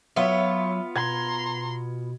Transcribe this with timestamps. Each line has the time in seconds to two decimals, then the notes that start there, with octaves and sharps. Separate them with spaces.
0.16 F#3 B3 F4 C#5 E5
0.96 B2 A#5 C6 G#6